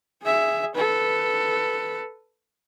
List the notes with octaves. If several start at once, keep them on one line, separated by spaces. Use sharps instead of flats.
G#4 E5
A4 B4